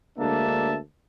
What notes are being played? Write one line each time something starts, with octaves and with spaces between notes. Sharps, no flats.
D2 G#3 A#3 D4 E5 A5